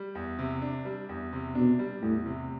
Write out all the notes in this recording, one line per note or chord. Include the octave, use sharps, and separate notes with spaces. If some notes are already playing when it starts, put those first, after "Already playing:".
Already playing: G3
E2
C3
D4
G3
E2
C3
B2 D4
G3
E2 A2
C3